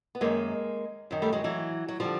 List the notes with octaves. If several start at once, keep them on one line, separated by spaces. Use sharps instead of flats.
B3
F#2 D#3 G#3 A#3
F#2 D#3
G3 A3
F#3 G#3
E3 F#3
F#3
D3 F3 G3